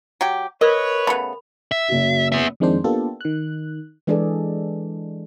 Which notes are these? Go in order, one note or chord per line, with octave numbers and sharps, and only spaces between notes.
F#3 G4
A#4 B4 C#5 D#5
C#3 A3 B3 B5
E5
F#1 F#4
B3 E5
F2 D#3 G#3 C4 D4 C5
A#3 B3 D4 F4 G4 A4
D#3 F#6
E3 G#3 D4 G#4 A4 D5